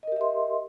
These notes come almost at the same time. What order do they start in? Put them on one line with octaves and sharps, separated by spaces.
D#5 A#4 G4 E5 C6